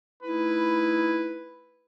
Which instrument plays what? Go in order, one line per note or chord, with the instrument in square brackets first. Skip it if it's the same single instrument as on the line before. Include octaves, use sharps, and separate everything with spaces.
[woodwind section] A3 D#4 E4 [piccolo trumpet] B4